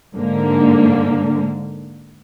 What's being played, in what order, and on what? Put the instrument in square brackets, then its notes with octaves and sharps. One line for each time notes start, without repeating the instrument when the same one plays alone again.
[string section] G#2 D3 A#3